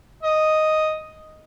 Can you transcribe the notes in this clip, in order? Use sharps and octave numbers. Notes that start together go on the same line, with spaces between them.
D#5